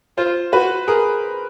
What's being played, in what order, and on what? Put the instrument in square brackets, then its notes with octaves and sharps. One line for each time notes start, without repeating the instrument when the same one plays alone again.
[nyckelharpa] F4 [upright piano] C5
[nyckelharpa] F#4 [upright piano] B4
[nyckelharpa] G#4 [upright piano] A#4